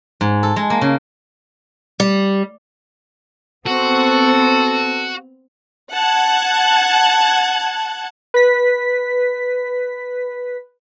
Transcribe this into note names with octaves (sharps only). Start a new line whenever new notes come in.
G#2
A4
G#3
A#3
C#3
G3
B3 C4 F#4 A4
F#5 A5 F#6 G#6
B4 B6